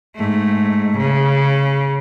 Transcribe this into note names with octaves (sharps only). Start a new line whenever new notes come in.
G#2 A3
C#3